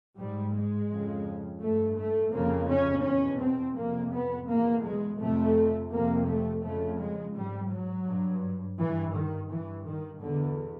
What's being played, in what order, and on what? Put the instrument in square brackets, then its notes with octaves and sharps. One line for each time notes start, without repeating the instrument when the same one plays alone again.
[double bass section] G#2 G3
G#3
F2 C#3
G2 A3
A3
F2 C#3 A#3
C#4
E2 B2 C#4
C4
F2 C3 A#3
B3
E2 B2 A#3
G#3
F2 C3 A3
F2 C3 A#3
A3
F2 C#3 A3
G#3
G#2 G3
F#3
G2
G2 E3
D#3
G2 E3
D#3
E2 B2 D3